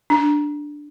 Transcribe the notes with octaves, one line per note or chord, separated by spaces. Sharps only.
D4